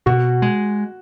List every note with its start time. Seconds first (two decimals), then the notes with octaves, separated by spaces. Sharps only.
0.06 B2 F#4
0.42 G#3